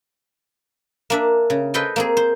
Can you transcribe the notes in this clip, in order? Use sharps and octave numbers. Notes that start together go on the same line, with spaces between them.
A#3 D4 E5
C#3
A4 B4 C5 D#5 G5 G#5
A#3 C4 G#4
C5